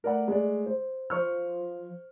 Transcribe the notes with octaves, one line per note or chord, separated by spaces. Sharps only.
A3 A#4 D5 F#5
G#3 D5
C5
F3 C5 C#6 F6